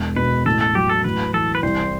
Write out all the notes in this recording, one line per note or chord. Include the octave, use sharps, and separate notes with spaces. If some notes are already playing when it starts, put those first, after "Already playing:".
Already playing: E1
B2 B4
A1 A4
A4
F#3 G4
A4
A1 B4
E3 A4
B4
C2 C5